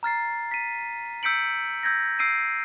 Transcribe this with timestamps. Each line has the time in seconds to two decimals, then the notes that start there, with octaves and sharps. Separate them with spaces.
0.03 A#5 F6 A6 C7
0.51 B6 D#7
1.23 E6 G6 B6 C#7 D7 F#7
1.83 E6 G6 G#6 A#6
2.19 E6 C7 D7 D#7